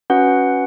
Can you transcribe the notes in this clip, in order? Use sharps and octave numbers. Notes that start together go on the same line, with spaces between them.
C#4 F#4 B4 F#5